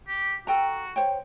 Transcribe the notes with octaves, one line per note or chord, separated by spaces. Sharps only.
G4
F#4 A4 G5 A#5
C5 C#5 G5